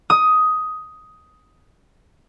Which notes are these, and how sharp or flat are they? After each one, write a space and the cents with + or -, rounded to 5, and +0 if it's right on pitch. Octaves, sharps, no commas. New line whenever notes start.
D#6 +10